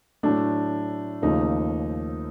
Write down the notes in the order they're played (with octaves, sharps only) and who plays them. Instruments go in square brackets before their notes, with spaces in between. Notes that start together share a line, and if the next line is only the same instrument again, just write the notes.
[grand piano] A2 F#3 A3 [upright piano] D4
[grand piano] D#2 C#3 F3 A3 [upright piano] D#4